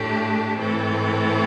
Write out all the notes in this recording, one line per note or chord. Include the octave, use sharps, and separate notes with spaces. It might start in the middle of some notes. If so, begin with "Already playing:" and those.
Already playing: A2 A3 D4 G4
A2 E3 C4 A4